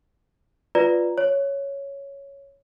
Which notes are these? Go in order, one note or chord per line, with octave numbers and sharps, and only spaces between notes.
F4 B4 D5 A#5
C#5